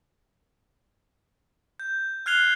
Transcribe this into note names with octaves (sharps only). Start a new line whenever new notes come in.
G6
F6 F#6 G#6 C7 F7 G7